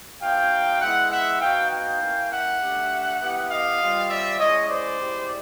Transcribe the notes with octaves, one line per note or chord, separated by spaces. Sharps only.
B3 D#4 F#4 F5 G5
G#3 B3 E4 E5 F#5
E5 F#5
B3 D#4 F#4 F5 G5
F5 G5
A#3 C#4 E4
E5 F#5
A3 D4 G4
B3 E4 G4
D#5 F5
G3 C4 F4
D5 E5
G#3 C#4 E4 C#5 D#5
C5 D5
G#3 C4 E4 G4